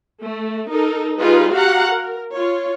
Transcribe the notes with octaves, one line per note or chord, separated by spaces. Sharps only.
A3
D#4 A4 A#4
G3 D#4 F4 G#4 B4
F#4 G4 F5 F#5 A#5
A#4
F4 C#5